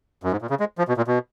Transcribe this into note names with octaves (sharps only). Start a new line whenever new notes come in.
F#2
G#2
A#2
C#3
G#3
F3
B2
A#2
B2